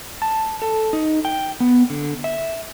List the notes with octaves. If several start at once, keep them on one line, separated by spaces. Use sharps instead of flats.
A5
A4
D#4
G5
B3
D3
E5